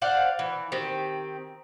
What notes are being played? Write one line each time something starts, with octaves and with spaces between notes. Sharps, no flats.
C5 D5 F5 F#5
E3
D#3 C4 G4